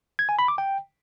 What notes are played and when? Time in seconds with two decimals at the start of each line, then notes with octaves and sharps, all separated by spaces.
0.19 G#6
0.29 G#5
0.39 B5
0.48 D6
0.58 G5